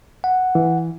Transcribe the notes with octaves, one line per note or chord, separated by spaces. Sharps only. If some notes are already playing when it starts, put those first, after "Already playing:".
F#5
E3